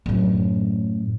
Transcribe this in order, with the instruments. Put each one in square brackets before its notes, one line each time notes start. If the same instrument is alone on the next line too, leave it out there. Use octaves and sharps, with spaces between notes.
[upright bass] F#2 A2